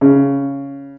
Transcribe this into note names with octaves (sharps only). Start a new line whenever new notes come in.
C#3